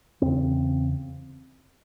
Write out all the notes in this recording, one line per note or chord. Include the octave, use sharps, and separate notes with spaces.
E2 C#3 C4